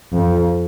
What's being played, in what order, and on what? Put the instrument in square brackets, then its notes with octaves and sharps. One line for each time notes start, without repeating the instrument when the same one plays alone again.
[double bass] F2